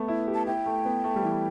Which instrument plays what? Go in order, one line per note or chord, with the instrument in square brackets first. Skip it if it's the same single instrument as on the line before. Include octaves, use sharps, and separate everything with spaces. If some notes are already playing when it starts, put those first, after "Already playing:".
Already playing: [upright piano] A3 B3
E4
G4
[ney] A5
[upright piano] E4 [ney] G5
[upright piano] A3
B3
A3
G3
E3